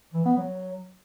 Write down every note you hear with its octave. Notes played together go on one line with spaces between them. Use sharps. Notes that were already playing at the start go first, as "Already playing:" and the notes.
E3
B3
F#3